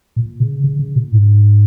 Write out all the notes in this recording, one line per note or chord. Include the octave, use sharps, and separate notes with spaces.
A#2
C#3
C#3
C#3
A#2
G#2